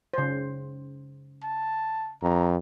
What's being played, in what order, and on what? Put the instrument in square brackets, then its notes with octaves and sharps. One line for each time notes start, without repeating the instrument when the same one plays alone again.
[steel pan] C#3 C5
[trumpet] A5
[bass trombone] F2 [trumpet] A#5